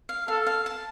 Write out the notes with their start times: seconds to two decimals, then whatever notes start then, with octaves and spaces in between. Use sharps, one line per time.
0.09 F5
0.28 A4 F5
0.47 F5
0.66 A5